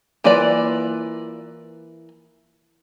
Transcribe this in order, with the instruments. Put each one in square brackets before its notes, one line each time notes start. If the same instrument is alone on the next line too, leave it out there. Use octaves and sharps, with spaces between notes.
[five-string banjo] E3 A#3 F4 B4 D5